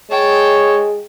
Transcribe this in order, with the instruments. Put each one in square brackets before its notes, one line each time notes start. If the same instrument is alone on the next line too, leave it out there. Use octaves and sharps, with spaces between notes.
[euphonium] G#3 [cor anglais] C#5 [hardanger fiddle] G5 A5